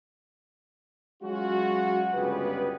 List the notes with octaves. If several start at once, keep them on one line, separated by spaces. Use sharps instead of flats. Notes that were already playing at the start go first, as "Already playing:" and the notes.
F#3 G#3 C#4 F4 F#4
G1 C#2 B3 G4 G#4 B4